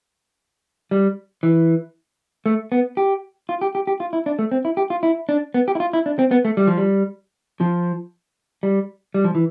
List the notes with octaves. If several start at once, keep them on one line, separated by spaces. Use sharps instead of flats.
G3
E3
A3
B3
G4
F4
G4
G4
G4
F4
E4
D4
A3
C4
E4
G4
F4
E4
D4
B3
G4
E4
F4
E4
D4
C4
B3
A3
G3
F3
G3
F3
G3
G3
F3
E3